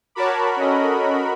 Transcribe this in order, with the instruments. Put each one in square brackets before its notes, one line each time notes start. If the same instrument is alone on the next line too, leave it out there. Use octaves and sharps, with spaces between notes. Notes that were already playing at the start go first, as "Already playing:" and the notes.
[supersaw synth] F#4 A#4 B5 [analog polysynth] C#5 A5 D6
[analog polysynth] C#4 A4 D#5